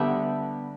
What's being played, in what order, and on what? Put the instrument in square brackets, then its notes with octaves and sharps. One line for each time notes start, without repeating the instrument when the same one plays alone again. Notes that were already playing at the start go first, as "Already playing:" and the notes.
Already playing: [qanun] D3 G3 B3 E5 G5